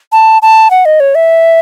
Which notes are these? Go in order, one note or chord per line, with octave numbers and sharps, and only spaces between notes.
A5
A5
F#5
D#5
C#5
E5